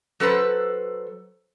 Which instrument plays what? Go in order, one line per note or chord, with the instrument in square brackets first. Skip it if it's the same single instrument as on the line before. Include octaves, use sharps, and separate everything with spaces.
[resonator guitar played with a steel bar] F#3 A4 B4 C5